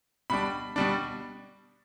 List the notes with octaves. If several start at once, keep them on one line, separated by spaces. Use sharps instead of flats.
B2 G3 D4 B5
B2 G3 D4